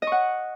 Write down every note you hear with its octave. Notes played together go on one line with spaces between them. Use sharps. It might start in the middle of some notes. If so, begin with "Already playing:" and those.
D#5 F#5 C#6